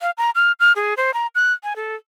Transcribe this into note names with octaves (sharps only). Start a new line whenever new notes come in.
F5
A#5
F6
F6
G#4
C5
A#5
F#6
G#5
A4